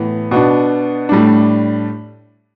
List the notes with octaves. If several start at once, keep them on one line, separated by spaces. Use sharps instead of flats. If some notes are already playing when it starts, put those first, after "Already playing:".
Already playing: A2 E3 B3
B2 B3 D4
A2 G3 D4